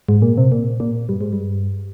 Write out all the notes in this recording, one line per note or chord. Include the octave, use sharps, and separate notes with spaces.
G#2
A#2
C3
A#2
A#2
G2
G#2
G2